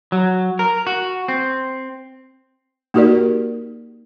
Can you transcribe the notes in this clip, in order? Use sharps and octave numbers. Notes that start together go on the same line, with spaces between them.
F#3
A#4
F#4
C4
A#3 D#4 F#4 G4 A#4 D5